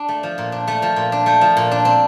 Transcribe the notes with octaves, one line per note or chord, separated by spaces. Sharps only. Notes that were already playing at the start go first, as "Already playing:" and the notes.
Already playing: D4
A3
F3
A#2
D4
A3 A5
F3
A#2
D4
A3 G5
F3
A#2
D4
C4